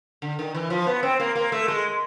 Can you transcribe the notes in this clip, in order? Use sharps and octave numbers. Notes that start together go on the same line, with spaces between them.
D3
D#3
E3
F3
B3
C4
A#3
A#3
A3
G#3